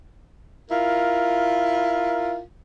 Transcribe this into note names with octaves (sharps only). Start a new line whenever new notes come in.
E4 F4 A#4